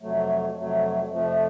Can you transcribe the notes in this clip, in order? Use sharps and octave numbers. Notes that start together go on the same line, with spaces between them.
F2 C3 F#3 A3
F2 C3 F#3 A3
F2 C3 F3 A3